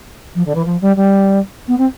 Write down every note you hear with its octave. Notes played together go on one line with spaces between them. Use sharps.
F3
D3
E3
F3
G3
G3
B3
C4